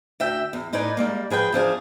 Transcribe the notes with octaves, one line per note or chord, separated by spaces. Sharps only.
D2 E5 G5
E2
A2 D#4 B4 D5 G#5
G3 G#3 A#3
F3 G#4 B4 G5
E2 F3 D4 G#4